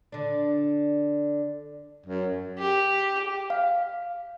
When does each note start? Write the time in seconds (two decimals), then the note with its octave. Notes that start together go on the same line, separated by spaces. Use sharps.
0.12 D3 D4
2.06 F#2
2.59 G4
3.50 F5